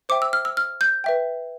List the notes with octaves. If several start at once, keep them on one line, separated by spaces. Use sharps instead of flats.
C5 E5 G5 D6
E6
F6
E6
F6
G6
B4 E5 G5